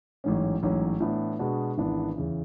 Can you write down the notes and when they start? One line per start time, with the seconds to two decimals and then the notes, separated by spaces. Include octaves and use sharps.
0.24 A1 G#2 F#3 C#4
0.63 A1 G#2 F#3 C#4
1.00 A2 E3 B3 D4
1.39 B2 G#3 B3 D4 F#4
1.77 G#1 G#2 E3 B3 D4
2.15 E2 C#3 E3